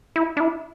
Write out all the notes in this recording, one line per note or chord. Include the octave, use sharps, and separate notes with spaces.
E4
D4
E4